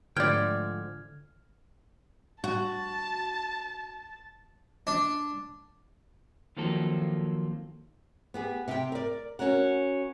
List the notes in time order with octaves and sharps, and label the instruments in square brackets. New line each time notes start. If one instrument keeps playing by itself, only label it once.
[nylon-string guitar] G#2 F3 A3 [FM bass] D3 [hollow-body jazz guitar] D5 G5 [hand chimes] F6 G#6
[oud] F#4 [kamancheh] A5
[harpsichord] D4
[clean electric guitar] D#3 F3 F#3 A#3 C4 A4
[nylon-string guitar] B3 G4 G#4
C3 G4 G5
A#4 D5
C#4 F#4 A#4 F#5